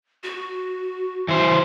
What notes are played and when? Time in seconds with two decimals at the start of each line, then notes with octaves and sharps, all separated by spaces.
0.24 F#4
1.28 E3 C5